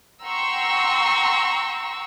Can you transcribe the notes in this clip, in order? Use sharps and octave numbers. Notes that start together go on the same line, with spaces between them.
F#5 G5 A#5 C6 C#6 E6